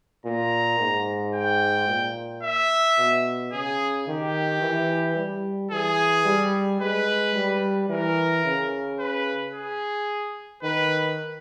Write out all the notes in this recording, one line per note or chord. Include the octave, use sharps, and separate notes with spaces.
A#2 A#5
G#2
G5
A#2
E5
B2
C#3 G#4
D#3 G4
E3
G3
E3 G#4
G3
G#3 B4
G3
E3 A#4
C#3
B4
G#4
D#3 B4